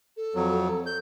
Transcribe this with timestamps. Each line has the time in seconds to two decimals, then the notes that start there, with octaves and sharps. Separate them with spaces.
0.16 A4
0.35 F2 F#3
0.86 G6